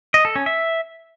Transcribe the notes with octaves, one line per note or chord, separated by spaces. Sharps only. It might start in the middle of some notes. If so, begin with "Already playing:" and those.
D#5
A4
C#4
E5